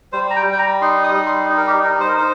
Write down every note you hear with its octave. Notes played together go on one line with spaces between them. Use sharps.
G3 C5
A#5
G5
G3
G5
A#5
D#4 C6
D#6
G3
C6
D#4
A#4
G4
D#4 A#4
C5
A#4
D#4 C5